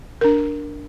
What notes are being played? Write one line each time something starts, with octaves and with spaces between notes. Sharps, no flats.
D4 A#4